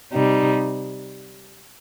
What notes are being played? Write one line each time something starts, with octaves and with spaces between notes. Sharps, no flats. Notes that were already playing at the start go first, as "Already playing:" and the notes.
C3 G3 D#4